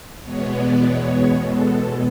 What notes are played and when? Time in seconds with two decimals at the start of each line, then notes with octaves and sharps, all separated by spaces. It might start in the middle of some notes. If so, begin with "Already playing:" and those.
0.22 E2 B2 G#3 B3 C#5
0.52 D5
0.81 C#5
1.40 A4